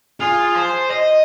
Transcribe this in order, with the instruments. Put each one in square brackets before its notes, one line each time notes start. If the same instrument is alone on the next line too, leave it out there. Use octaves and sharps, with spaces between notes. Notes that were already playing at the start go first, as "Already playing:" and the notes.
[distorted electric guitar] F4 [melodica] G#4
[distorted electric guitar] C5
D#5